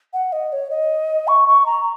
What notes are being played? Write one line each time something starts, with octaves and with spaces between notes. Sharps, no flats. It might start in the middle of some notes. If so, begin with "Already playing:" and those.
F#5
D#5
C#5
D#5
C#6
C#6
A#5